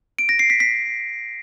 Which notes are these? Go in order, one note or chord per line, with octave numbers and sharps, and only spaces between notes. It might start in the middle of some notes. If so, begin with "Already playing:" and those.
D7
A#6
C7
B6
B6